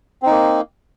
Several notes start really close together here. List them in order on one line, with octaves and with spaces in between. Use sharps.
C4 D#4 A#3